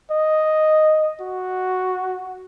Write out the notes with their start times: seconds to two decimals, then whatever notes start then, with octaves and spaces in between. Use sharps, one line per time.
0.11 D#5
1.21 F#4